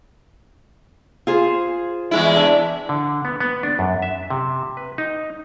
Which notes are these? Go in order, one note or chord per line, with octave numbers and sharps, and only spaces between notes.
F4 G#4 C5
E2 G#3 E4
D4 E5
D3
B3
B3
D4
F#2
E5
C3
B4
D#4